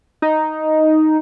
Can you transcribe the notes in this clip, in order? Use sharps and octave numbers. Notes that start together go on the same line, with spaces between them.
D#4